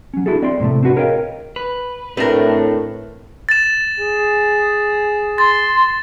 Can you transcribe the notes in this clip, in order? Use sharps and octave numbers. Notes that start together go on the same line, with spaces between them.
F#3 C#4
D4 E4 F#4 G#4 A4
C4 D5 E5 G5 C6
A2 C3 G#3 A3
C4 D4 F#4 B4
G#4 A#4 C#5 D#5 F5 G5
B4
A2 A3 C4 D4 A#4 B4
A6 E7
G#4
C6 A6